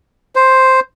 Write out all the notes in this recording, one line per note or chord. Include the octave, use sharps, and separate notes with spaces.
C5